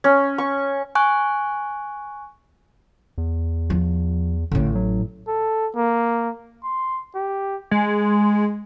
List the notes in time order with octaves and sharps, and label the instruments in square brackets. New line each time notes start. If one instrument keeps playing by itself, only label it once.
[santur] C#4
C#6
[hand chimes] G#5 C#6 F#6
[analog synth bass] E2
[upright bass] F3
[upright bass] A1 A2 [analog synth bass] D3
[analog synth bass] F#3
[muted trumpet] A4
A#3
C6
G4
[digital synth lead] G#3